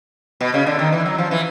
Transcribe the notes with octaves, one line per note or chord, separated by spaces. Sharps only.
B2
C#3
D3
D#3
E3
F#3
F3
E3